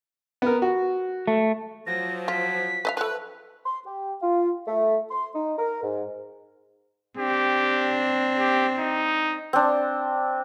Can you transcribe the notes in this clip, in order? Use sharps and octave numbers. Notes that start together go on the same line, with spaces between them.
B3 A#4
F#4
A3
F3 F#3 A#6
F4 B6
B4 D#5 F5
F3 A3 B4
C6
G4
F4
A3
C6
D#4
A#4
G#2
C4 D4 G4
G4
D#4
C4 D4